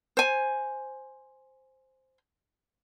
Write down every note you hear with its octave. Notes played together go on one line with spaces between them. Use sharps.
C5 G#5